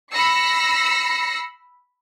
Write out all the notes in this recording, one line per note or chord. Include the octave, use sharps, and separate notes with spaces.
B5 E6 A#6 C7 C#7